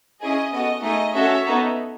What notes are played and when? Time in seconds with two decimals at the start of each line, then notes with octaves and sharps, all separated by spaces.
0.21 C#4 E4 G#4 D#5
0.52 B3 F#4 A4 D#5
0.83 A3 D#4 G#4 D#5
1.14 C#4 F#4 A4 C#5 E5
1.45 B3 D#4 A4